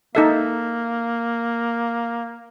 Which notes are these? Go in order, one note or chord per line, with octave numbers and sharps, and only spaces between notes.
A#3 D#4 A4 E5